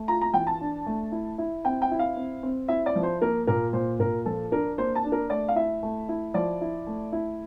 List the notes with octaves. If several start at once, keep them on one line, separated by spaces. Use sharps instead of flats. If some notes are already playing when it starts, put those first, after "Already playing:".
Already playing: A3
F4 A#5
A#5
E3 G5
A5
D4
A3
E4
E4
C4 G5
G5
E4
F5
C4
C4
E4 E5
D5
F3
C5
A#3 A#4
A#2 A#4
A#2 C5
A#2 A#4
F3 A4
D4 A#4
A#3 C5
A5
D4
A#4
A3 D5
F5
E4 E5
A3
E4
F3 D5
E4
A3
E4